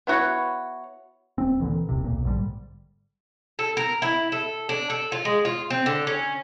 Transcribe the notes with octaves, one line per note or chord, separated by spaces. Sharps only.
B3 E4 F#4 C#5
D1 C4
A#2 D3 E3
D#1 C2 C3
B1 A#2
A#1 G#2 D3 G3
A4
A#4
E4
A4
D4
A4
F4
G#3
F4
C4
D3
C#4